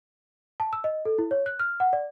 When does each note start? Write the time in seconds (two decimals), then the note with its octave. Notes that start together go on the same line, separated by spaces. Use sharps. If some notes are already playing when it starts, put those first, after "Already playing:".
0.60 A5
0.73 E6
0.84 D#5
1.05 A4
1.18 E4
1.31 C#5
1.46 F#6
1.59 F6
1.80 F#5
1.93 D5